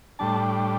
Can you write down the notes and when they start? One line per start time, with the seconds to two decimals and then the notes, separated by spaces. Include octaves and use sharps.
0.19 A2 G3 D4 A5